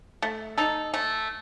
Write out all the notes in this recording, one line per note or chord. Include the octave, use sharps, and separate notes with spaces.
A3
D#4 A4
A3